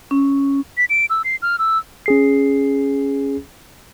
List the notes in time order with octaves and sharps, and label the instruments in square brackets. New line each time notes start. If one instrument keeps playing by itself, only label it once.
[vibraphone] C#4
[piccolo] B6
D7
E6
C7
F6
E6
[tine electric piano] C#4 G#4 C7